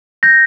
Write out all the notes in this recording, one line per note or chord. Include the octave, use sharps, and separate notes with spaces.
G6 A#6